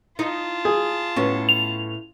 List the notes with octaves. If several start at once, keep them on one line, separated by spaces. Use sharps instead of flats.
D#4 F4 A5
G#4
A2 B3 C#4
F7